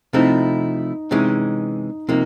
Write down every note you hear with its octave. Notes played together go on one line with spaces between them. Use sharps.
C3 F3 A3 C4 D#4 E4
C3 E3 G#3 C#4 D#4
C3 F3 A#3 D#4